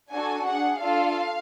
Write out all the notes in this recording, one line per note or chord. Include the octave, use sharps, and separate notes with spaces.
D4 F#4 A4 G#5
D4 G#4 F#5
D4 F4 A4 F5